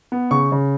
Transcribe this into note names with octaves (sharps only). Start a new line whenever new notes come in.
B3
C#3 C#6
C#3